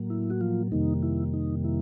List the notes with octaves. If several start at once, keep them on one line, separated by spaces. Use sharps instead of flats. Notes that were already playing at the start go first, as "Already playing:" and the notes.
Already playing: A2 F#3 A#3
E4
F#4
F3 F4
F2 C3 D#3 G3 A#3 D#4
E4
D#4
E4